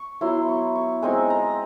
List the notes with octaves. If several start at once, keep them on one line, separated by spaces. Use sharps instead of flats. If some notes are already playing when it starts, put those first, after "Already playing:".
Already playing: C#6
F#3 B3 E4 C6
C#6
C#6
G#3 C4 D#4 G#5
A#5